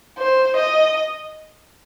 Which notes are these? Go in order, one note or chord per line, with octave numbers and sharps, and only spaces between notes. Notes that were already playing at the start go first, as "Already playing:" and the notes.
C5
D#5